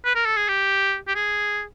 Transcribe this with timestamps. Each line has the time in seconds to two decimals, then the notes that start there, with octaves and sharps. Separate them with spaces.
0.05 B4
0.15 A#4
0.26 A4
0.37 G#4
0.48 G4
1.07 G4
1.15 G#4